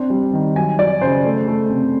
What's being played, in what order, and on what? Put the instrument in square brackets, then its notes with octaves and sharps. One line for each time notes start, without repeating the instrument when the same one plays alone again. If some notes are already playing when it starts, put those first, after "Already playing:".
Already playing: [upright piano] C4 D4
G3
D#3
F#3 G#5
F#3 D5
C#3 C5
A3
A3
C3